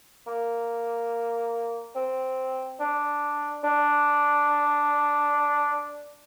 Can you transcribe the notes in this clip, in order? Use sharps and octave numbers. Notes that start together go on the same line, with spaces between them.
A#3
C4
D4
D4